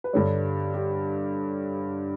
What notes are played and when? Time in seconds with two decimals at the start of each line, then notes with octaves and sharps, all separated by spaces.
0.04 B4
0.13 G2 D3 G3 C#5
0.74 G4